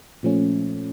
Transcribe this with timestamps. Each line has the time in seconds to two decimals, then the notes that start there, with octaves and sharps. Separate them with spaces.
0.23 A#2 F3 A3 C#4